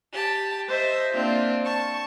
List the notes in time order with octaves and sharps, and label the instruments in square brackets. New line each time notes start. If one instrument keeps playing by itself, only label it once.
[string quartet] G4 A5
C5 D#5 E5
A#3 C4 D4 F4
A5 C#6